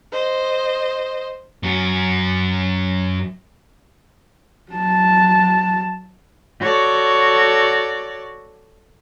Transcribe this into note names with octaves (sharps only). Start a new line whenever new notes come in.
C5 D#5
F#2 F#4
F#3 A5
F#4 A4 C#5 D5